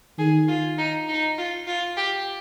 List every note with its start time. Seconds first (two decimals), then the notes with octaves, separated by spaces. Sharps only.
0.19 D#3 G#4
0.48 F4
0.78 D#4
1.08 D#4
1.38 F4
1.67 F4
1.97 G4